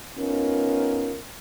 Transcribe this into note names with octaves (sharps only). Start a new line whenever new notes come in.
B3 C#4 D#4 F4 A#4